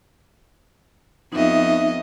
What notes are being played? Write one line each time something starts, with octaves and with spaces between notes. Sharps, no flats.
F2 B3 D#4 D#5 E5